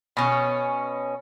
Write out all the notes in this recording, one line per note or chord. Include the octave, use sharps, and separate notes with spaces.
B2 C#4